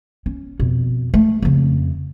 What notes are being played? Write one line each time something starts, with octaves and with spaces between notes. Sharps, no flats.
C#4
F2 B2
A3
F2 C#3